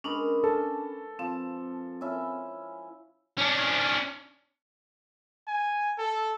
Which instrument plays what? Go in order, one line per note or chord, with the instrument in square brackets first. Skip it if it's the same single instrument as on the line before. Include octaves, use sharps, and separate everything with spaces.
[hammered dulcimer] G#3 A#4 B4 [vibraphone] C#4 D4
[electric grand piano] A4 [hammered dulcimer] A5
[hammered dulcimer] F3 [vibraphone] C4
[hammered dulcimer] C#4 E4 E5
[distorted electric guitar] C#4 D4
[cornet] G#5
A4